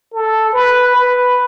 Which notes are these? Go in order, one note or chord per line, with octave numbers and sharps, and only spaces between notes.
A4
B4
B4